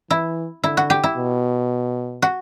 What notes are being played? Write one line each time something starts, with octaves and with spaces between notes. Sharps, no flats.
E3 E4
D3 E4
F#4
G4
E4
B2
F#4